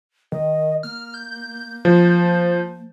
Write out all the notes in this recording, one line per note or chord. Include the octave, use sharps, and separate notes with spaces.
D#3 D#5
A#3 F6
G6
F3 C5